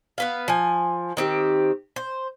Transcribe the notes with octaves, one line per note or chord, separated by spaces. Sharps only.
B3 B4 F5
F3 G#5
D#3 C4 G4
C5